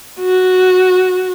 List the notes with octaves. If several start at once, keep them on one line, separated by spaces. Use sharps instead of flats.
F#4